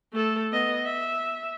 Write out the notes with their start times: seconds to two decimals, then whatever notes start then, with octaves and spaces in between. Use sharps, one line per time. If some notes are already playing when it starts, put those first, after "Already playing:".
0.13 A3 A4
0.52 B3 D#5
0.85 E5